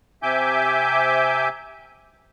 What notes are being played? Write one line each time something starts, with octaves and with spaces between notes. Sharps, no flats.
C3 E5 G#5 D6 G6